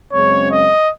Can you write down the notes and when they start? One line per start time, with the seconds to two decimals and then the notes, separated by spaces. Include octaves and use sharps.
0.12 F#2 C#3 G#3 C4 C#5
0.49 D#5